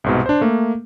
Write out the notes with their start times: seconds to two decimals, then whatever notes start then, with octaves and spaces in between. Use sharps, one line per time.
0.04 C2 G#2 B2
0.26 D4 C5
0.41 A3 A#3